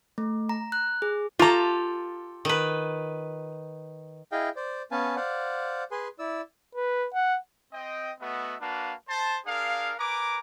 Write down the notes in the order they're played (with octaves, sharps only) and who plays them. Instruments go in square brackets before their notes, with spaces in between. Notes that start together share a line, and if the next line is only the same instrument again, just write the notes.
[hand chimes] A3
A#5
F#6
G#4
[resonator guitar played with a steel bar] F4 A#5 [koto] G4 A4
[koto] D#3 B4
[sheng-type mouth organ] E4 G#4 D#5 F5 G5
C5 D5
B3 C#4 B4 F5 G#5 A5
C5 D5 F5 F#5
G#4 B4 G#5 C6
E4 D5 E6
[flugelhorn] B4
F#5
[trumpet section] C4 D#5 G5
A3 B3 F#4 B4 D#5 E5
A#3 D4 F#4 B4 F5 A5
C5 A5
D4 G#4 A#4 F5
A#4 B4 G#5 A#5 D6